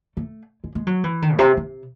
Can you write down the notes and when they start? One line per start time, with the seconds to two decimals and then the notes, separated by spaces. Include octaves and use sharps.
0.17 A3
0.64 G#3
0.75 G#3
0.87 F#3
1.04 E3
1.22 D#3
1.34 A2
1.39 C3
1.57 C3